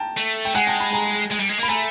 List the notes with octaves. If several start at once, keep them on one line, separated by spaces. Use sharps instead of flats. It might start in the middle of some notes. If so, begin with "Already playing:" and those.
Already playing: G5 A5 A#5
A3
G5
G#3 F#5 G#5
G5 A5
A5 B5
G#5 A#5
G#3
G3
G#3
A#3 B5
A3 G#5 A#5